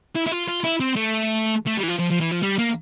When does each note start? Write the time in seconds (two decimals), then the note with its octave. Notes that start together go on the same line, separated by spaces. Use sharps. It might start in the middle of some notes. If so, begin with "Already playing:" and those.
0.15 E4
0.26 E4
0.32 F4
0.48 F4
0.64 E4
0.80 C4
0.96 A3
1.66 A3
1.77 G3
1.83 E3
1.88 F3
1.99 F3
2.10 F3
2.20 E3
2.31 F3
2.42 G3
2.58 A#3